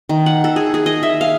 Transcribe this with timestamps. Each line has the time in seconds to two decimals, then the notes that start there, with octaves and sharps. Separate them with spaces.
0.09 D#3
0.26 F#5
0.44 A4
0.56 G#4
0.74 G#4
0.86 D#5
1.03 E5
1.21 F5